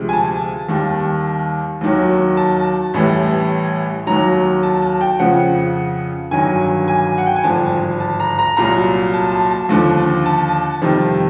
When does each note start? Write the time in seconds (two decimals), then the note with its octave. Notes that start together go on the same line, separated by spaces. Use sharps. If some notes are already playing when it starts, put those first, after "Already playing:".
Already playing: D2 C3 F3 G#3
0.09 G#5
0.13 A5
0.69 D#2 D#3 G3
1.81 D#2 D#3 F#3
2.37 A5
2.94 A1 A2 E3 G3
4.07 D#2 D#3 F#3 A#5
4.63 A5
4.82 A5
5.01 G5
5.19 F2 C#3 F3 F#5
6.31 G1 G2 D#3 F#3 G#5
6.88 G#5
7.18 F#5
7.27 G5
7.36 G#5
7.44 G#1 G2 D3 F3 A5
8.00 A5
8.20 A#5
8.39 A#5
8.57 C2 A#2 F#3 A#5
9.14 A5
9.32 A5
9.51 A5
9.69 D#2 D3 F3
10.26 A5
10.82 F2 C3 D#3 G3